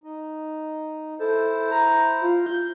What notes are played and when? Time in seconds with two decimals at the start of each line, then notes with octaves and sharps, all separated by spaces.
0.04 D#4
1.19 E4 A4 C5
1.71 A#5
2.21 F4
2.46 G6